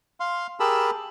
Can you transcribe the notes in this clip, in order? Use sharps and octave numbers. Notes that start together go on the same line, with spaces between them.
F5 C6
G4 G#4 A#4 A5 B5 E6